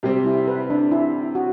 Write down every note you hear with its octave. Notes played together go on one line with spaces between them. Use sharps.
C3 G3 C4 G4
E4
B4
D4
E4
F#4